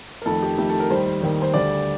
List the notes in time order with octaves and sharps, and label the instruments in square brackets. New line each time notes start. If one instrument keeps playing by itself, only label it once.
[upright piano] A#4
F2 D#3 A3 A4
G4
F2 D#3 A3 G4
A4
A#4
D#2 D#3 G3 C5
D#2 D#3 G3
C5
D2 D3 G3 D5